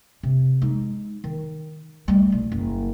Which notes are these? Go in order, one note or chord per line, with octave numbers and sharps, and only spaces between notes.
C3
G#3 D#4
D#3
G3 A3
B1
F#1